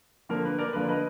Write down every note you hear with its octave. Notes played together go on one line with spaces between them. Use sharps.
D3 F3 A#3 A#4
B4
A#4 D5
D3 F3 A#3 B4
B4 D#5